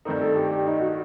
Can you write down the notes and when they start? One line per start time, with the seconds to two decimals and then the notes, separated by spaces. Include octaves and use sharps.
0.05 G2 D#3 A3 C4 D#4 A#4
0.21 A4
0.36 G4
0.51 G4
0.67 D#4
0.81 F#4